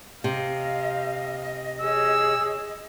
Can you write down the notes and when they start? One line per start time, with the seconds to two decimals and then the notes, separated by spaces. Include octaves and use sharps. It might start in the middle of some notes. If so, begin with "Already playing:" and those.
0.24 C3 D#5 F5
1.81 G#4 C#5 E6